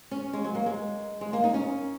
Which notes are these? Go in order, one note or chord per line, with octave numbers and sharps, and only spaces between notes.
C#4
G#3
F#3
A#3
G#3
G#3
A#3
D#4
C#4